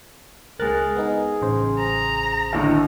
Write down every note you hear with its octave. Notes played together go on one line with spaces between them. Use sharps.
C#2 G#3 G#4 A#4 F#6 A6
B3 D#4
A1 C#3 C5
A#5
D#2 A2 D3